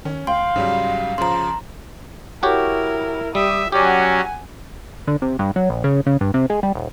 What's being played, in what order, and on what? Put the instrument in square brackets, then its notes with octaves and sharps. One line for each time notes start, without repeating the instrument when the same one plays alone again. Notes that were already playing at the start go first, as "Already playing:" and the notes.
[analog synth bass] D#3 [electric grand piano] C#4
[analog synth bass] D2 [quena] F5 [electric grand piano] G5 [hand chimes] C6
[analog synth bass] G#2 [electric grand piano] C#3 F#3 G3
[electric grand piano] C#3 F3 [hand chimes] A#5 C6
[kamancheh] E4 A#4 [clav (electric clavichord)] F#4 G4 C#5
[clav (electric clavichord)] G3 [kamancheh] G4 D#6 [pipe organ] E5
[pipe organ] F#3 C#4 [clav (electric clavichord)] G4 D5 [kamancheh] F#5 G#5
[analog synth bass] D3
C3
G2
F#3
A#1
C#3
C#3
G2
C3
G#3
G3
D#1